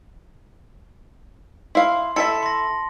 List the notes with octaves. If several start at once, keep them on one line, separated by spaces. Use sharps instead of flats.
E4 F5 C6
E4 A4 E5 A5 C#7
C6 A#6